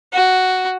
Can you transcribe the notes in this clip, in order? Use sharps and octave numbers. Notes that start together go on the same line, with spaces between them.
F#4